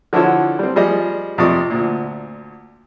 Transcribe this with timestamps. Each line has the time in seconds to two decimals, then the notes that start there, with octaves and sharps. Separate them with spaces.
0.13 D3 F3 E4 F#4 A4 C#5
0.59 G3 C4
0.76 F3 G3 G#4 D#5
1.38 F2 C3 F3 D5 C#6 D#6
1.70 D2 A#2